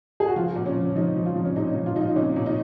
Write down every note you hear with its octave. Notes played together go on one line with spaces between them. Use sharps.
G#4
F#4
F3 F4
A#2
C#4
F3
F3 D#4
F3
F4
F3
C#4
A#2 D#4
D#4
F3
F4
F3 D#4 F4
D#4
A#2 C#4
A#2
D#4